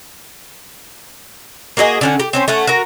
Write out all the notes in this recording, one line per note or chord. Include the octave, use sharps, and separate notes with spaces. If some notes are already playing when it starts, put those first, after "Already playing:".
A#3 F#4 G#4 D#5
D3 C#4 F#5
G4
C4 C#4 C5
A3 C#4 F#5
F#4 A#4